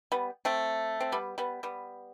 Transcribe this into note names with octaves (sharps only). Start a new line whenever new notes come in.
G3 B3
A3 C4
C4
G3 B3
G3 B3
G3 B3